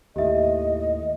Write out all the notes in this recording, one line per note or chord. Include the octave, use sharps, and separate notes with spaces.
D#2 A2 G4 D#5 E5